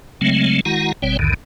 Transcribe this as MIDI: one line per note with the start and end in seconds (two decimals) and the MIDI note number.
0.21 0.61 49
0.21 0.61 54
0.21 0.61 56
0.21 0.61 57
0.21 0.61 60
0.65 0.92 51
0.65 0.92 56
0.65 0.92 64
0.65 0.92 66
0.65 0.92 78
0.65 0.92 82
1.02 1.17 31
1.02 1.17 47
1.02 1.17 55
1.02 1.17 60
1.02 1.17 73
1.02 1.17 79
1.19 1.34 35
1.19 1.34 40
1.19 1.34 44
1.19 1.34 50
1.19 1.34 51